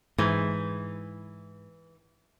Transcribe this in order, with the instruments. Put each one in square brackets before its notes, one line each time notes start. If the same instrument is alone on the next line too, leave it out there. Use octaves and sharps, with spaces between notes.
[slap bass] G#2 [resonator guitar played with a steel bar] E3